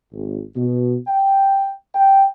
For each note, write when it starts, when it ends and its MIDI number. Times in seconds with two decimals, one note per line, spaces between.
0.13 0.41 32
0.55 0.97 47
1.07 1.72 79
1.95 2.25 79